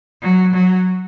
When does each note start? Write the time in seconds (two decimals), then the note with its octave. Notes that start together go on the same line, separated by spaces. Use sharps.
0.22 F#3
0.54 F#3